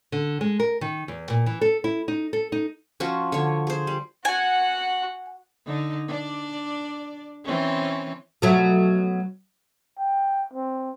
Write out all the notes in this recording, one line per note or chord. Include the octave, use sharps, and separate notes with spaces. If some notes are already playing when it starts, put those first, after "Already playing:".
D3
G#3
A#4
D#3
E2
A#2
E3
A4
E4
D#4
A4
D#4
F3 C#4 F4 F#4
D3 C#5
G#4 C5
G3
F#4 F#5 G#5
D3 D#4
D4 D5
E3 C4 C#4
B2 F#3 A3
G5
C4